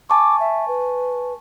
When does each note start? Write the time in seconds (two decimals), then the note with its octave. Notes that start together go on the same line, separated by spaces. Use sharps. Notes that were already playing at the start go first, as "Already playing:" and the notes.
0.10 G#5 A5 C#6 D6
0.40 E5
0.68 B4